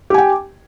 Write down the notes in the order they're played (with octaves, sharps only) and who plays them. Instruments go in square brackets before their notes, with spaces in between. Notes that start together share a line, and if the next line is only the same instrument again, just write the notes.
[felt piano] G4
G#5
G5